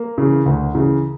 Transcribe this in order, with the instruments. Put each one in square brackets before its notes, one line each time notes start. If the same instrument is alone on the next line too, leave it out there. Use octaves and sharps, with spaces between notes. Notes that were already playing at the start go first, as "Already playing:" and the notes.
Already playing: [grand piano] A#3
C#3 E3
D2
C#3 E3